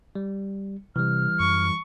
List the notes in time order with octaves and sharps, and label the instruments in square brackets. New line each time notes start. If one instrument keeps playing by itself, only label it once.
[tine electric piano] G3
[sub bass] C3 [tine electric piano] E3 G3 [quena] F6
[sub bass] F#2 [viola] C#6